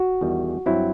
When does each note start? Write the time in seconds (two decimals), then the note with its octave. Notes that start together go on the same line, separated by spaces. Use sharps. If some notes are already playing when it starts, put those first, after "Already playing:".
Already playing: F#4
0.21 E2 D#3 G3
0.66 G2 F#3 C4 E4